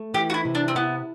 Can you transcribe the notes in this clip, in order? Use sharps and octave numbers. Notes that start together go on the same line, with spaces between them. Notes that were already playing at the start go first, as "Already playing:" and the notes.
Already playing: A3
E3 G4
F#4
E4
C3
D4
C4
B3 E4